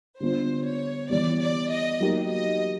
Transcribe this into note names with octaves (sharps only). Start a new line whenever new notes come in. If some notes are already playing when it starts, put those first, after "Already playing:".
D3 G3 B3 D4 F4 C5
C#5
E3 G3 B3 D5
D5
D#5
F#3 A#3 D#4 G4
D#5